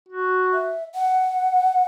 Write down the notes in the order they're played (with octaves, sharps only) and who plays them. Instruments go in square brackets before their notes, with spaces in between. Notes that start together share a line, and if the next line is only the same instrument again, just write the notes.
[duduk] F#4
[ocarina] E5
F#5